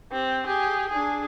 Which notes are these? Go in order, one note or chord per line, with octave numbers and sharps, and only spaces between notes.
C4 G4
G4 G#4
D4 G#4